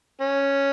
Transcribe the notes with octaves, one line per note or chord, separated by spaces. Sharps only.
C#4